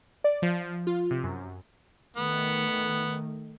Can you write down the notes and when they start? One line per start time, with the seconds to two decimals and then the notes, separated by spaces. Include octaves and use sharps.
0.24 D5
0.42 F3
0.87 F4
1.11 C3
1.24 F#2
2.17 D#3 A3 B3